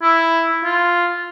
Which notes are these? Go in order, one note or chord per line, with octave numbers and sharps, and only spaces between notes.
E4
F4